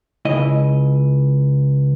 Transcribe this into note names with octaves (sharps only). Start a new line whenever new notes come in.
C#2 E4 D#5